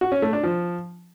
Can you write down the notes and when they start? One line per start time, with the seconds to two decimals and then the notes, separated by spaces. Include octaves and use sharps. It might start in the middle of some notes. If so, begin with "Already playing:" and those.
0.01 F#4
0.12 C#4
0.22 A3
0.33 D4
0.43 F3